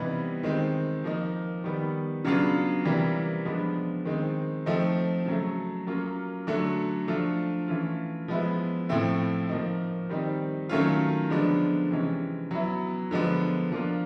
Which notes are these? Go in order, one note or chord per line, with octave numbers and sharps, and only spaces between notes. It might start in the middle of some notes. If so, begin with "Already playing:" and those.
Already playing: C3 E3 G3 B3 D#4
D#3 G#3 C4
F3 A#3 D#4
D#3 G3 B3
C#3 F#3 B3 D4 F4
C3 E3 G3 A#3
F3 G#3 B3 D4
D#3 G#3 C4
F3 A3 C4 D#4
C#3 F#3 A3
F#3 A#3 C#4 F4
D3 F#3 A3 D4
F3 A3 D4 F4
E3 A3 C#4 F4
F3 G#3 B3 E4
A2 F3 A3 C4 E4
F3 A#3 D#4
D#3 G3 C4 D#4
D#3 F#3 A3 C#4 F4
D3 F3 G#3 B3 D4
C3 E3 G#3 C#4
F#3 B3 E4
D3 F3 G#3 B3 D4
F3 A#3 D4 F4